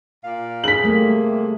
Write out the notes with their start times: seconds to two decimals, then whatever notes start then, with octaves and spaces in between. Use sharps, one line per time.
0.24 A#2 D5 F5
0.64 G#4 B6 F#7
0.84 C3 G3 A3 A#3